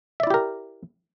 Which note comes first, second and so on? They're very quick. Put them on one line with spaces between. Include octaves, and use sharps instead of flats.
E5 D5 E4 G4 A#4